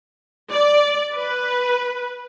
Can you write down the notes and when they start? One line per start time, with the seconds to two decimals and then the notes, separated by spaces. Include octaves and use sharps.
0.52 D5
1.15 B4